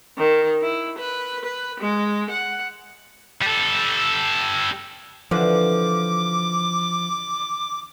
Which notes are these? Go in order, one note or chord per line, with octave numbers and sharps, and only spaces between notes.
D#3
E4
B4
B4
G#3
F#5
G3 A4
D3 E3 F3 D6